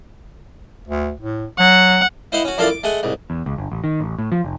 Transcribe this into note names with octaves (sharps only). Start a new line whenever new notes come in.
D2
A2
F#3 F#5
E4 C5 D#5 F5 F#5
C#4 F#4
F#2 D4 E4 F4 A4 F5
D6
G#3 A3 F#5 G#5
C2 G#2
E2
C#2
G1
A1
D#3
A1
A2
F3
F1